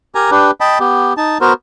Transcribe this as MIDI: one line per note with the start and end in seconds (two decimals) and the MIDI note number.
0.15 0.30 67
0.15 0.30 70
0.15 0.30 80
0.15 0.30 82
0.31 0.51 62
0.31 0.51 67
0.31 0.51 71
0.61 0.79 75
0.61 0.79 79
0.61 0.79 81
0.61 0.79 83
0.80 1.13 59
0.80 1.13 67
1.17 1.38 63
1.17 1.38 81
1.41 1.53 59
1.41 1.53 66
1.41 1.53 70
1.41 1.53 72